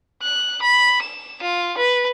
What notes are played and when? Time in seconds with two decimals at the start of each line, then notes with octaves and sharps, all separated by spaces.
0.22 F#6
0.62 B5
1.02 E7
1.42 F4
1.77 B4